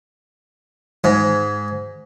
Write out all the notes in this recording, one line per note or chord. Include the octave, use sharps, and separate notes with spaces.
G#2